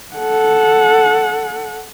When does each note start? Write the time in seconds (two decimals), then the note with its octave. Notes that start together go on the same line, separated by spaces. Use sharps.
0.15 A4 F#5